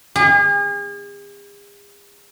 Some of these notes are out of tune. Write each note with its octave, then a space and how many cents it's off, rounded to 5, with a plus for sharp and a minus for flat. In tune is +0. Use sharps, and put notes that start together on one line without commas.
G#4 -40